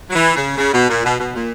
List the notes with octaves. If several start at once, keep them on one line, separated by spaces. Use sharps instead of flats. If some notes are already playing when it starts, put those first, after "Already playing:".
F#3
E3
C#3
C#3
B2
A#2
B2
B2
A#2